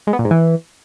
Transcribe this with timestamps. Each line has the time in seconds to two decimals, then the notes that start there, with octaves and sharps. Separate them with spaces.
0.07 G#3
0.13 B3
0.19 A#2
0.25 G#2
0.31 E3